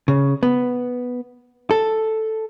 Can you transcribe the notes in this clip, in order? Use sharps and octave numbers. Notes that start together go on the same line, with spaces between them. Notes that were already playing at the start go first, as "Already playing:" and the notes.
C#3
B3
A4